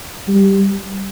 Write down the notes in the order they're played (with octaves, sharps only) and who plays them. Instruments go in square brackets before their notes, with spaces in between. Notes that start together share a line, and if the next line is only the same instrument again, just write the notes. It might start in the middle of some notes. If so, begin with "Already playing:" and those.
[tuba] G3